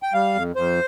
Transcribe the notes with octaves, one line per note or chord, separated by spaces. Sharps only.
G5
G3 F5
F2
F2 C5